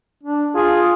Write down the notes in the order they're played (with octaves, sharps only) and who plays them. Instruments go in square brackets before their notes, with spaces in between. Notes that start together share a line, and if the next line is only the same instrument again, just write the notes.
[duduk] D4
[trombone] F4 [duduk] G#4